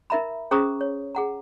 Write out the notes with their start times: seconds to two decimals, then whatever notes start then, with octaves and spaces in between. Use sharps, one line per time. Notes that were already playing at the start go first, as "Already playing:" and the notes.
0.10 D#4 A#4 E5 A#5 B5
0.51 C#4 G#4 C5 A#5 C#6 D#6
0.81 C#5
1.15 G#4 F#5 A#5